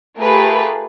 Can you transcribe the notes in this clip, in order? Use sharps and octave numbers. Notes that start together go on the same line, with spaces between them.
A3 F4 G4 G#4 A#4 B4